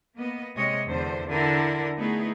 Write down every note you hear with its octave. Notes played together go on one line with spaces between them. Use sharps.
A#3 B3 D#5
C3 G#3 C#5 D#5
E2 D3 C5
D3 E4 A#4
A3 B3 D#4 E4 G#4